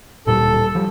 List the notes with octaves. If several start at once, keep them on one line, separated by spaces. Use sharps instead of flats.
D1 A#2 G3 A4
F3 G3